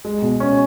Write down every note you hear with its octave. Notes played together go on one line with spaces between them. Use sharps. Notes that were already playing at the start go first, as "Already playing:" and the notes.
G#3
B2
C#4